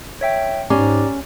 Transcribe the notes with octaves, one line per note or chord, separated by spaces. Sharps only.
C#5 E5 G5
G#2 C#4 G4 D5 A#5